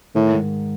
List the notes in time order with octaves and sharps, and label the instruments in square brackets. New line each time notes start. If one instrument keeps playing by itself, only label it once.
[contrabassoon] A2 [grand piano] D#3
[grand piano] G#2